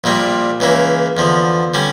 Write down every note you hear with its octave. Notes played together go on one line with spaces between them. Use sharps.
A#1 A#2 G3 A#3
C#2 C#3 E3 A#3
E2 D3 F3
D3 G3 C#4